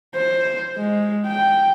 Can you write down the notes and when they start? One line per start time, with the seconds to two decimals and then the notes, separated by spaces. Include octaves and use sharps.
0.15 C5
0.76 G#3
1.27 G5